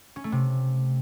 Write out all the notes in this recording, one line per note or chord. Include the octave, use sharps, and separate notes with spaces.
C#4
A3
C3